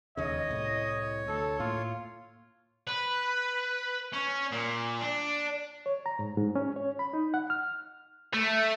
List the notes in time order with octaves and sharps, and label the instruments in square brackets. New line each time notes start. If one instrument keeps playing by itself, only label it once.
[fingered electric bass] E1 D#2 C#3 [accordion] C#5 [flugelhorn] D#5
[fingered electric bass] C2 A2
[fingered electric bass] D2 [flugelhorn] A4
[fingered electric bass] A2 A#3 [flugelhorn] F4
[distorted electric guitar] B4
C#4
A#2
D4
[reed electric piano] C#5
A#5
G#2
G#2
C#4
C#5
B5
D#4
F#5
F6
[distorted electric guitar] A3